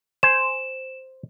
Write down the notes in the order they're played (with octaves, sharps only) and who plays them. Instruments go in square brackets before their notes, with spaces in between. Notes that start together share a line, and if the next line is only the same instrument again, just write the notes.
[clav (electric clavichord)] C5 G#5 [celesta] E7